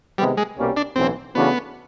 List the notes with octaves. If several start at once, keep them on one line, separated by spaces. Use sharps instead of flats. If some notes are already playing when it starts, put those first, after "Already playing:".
C3 D#3 G3 G#3 B3
G#3
C2 B2 G3 A#3 C#4
D4
B1 A2 E3 C4
C#3 E3 A3 B3 D4 F#4